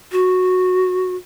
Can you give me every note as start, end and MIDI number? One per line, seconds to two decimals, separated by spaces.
0.12 1.15 66